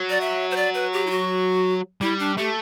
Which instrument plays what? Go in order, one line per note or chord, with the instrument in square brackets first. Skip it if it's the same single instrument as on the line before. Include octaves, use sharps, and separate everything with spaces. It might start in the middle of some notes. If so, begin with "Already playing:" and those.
Already playing: [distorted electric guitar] F#3
[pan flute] D5
E5
C5
D5
B4
G4
E4
F#4
[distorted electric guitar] G3 [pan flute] E4
[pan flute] D4
[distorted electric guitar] A3 [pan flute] G4